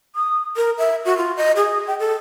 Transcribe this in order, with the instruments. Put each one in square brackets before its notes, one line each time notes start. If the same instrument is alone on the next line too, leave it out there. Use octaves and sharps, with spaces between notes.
[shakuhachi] D#6
A#4
E5
F#4
F4
D#5
G#4
G5
A4